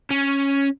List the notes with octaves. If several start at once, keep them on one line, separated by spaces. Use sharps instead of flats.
C#4